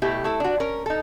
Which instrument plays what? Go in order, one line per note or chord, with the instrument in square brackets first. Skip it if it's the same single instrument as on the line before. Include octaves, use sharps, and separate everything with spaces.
[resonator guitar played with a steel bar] B2 A3 E4 G4
A3 E4 A4
D4 F#4
C#4 A#4
D#4 A4